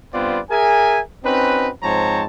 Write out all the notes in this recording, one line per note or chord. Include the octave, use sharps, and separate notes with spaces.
G2 B3 C4 F4 B4 D5
G#4 A#4 E5 G#5
C4 C#4 D#4 F#4 B4
G#2 F3 C4 C#5 A5 A#5